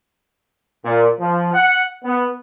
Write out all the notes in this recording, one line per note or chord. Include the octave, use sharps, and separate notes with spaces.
A#2
F3
F#5
B3